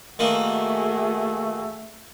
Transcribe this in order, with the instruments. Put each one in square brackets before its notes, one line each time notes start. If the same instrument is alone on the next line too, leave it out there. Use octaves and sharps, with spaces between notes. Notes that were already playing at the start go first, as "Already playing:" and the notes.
[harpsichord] D#3 E3 A#3 [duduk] A3 [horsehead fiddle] F#4 G#4